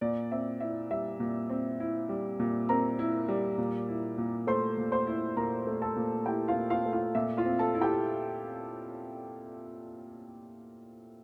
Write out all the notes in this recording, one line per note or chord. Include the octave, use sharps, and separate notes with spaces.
A#2 D5
C4 E5
E4 E5
G3 E5
A#2
C4
E4
G3
A#2
C4 A#4 A#5
E4
G3
A#2
E4
A#2
A3 C5 C6
A#2
C5 C6
E4
A#2 A#4 A#5
A3
A4 A5
A#2
E4 G4 G5
F4 F5
A#2
F4 F5
A3
F4 F5
A#2 E5
F4 F5
C4
A4 A5
E4
G4 G5